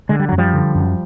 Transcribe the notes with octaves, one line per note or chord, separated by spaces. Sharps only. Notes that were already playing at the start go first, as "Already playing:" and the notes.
D3 G#3
G3
F#2 F#3
F3 G3
D3
F#2